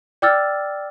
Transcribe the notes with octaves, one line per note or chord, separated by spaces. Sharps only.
D5 G5 D6 E6 F6 A6